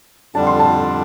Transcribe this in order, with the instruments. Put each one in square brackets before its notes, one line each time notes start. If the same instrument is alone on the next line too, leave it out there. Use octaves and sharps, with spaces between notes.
[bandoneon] F2 D3 G3 D4 [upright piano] A5
[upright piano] C6
A5